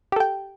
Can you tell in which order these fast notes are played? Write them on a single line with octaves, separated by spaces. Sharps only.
G4 A4 G5